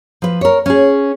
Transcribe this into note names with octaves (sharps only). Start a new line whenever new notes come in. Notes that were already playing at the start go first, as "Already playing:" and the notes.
F3 B4
A#4 C#5
C#4 G#4